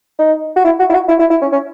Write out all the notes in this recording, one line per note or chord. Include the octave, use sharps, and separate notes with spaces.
D#4
F#4
E4
F#4
E4
F#4
E4
E4
E4
C#4
C#4